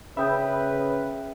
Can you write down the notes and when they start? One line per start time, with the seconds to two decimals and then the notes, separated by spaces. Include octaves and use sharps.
0.17 C#3 B4 E5 G5 B5 D#6 G6